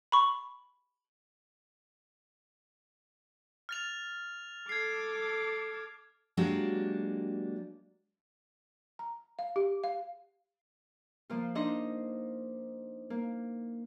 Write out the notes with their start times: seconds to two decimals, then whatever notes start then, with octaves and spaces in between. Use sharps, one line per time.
0.12 B5 C#6
3.69 F6 A6 F7
4.69 A4 D6 G#6 C7
6.37 F#3 G#3 A#3 D4 F#4 G4
8.99 A#5
9.39 F5
9.56 G4
9.84 F5
11.30 F3 A#3 F4
11.55 D4 D#4 C5 D#5
13.10 A#3